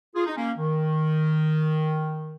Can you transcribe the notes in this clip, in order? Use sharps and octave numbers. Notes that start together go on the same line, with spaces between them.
F4 G#4
D#4
A#3 C#4
D#3